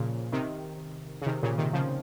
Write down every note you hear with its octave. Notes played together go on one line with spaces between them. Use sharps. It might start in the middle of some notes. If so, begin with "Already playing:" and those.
Already playing: A#2 C#3 F3
C3 D#3
C#3
C3 D#3
A#2 C#3
C3 D#3
C#3 F3